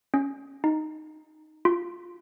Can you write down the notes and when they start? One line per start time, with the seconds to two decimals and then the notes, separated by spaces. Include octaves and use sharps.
0.14 C#4
0.64 D#4
1.65 F4